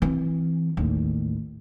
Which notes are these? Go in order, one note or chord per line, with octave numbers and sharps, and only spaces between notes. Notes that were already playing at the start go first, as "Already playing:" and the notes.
E3 C4
A1 D#2